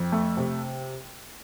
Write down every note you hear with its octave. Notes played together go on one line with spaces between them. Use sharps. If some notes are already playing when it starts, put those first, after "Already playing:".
Already playing: F2
A3
C3